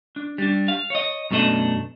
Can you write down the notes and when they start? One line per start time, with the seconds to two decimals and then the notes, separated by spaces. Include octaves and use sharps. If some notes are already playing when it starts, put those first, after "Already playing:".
0.16 D4
0.38 G3 D4
0.68 F5
0.90 C#5 D#5
1.31 F#2 B2 A3 D4 D#5